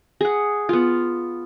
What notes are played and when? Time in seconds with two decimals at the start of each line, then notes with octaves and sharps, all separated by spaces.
0.21 G#4 F#5
0.69 B3 F4